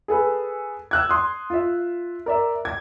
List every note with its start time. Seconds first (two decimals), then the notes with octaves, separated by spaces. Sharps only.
0.08 G#4 A4 B4
0.91 E6 F#6 G#6
1.09 C6 D#6
1.50 F4 E5
2.26 A#4 D5 E5
2.65 G#6